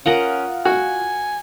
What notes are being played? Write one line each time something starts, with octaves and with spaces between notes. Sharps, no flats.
C#4 F4 A#4 D#5 F#5
F#4 G#5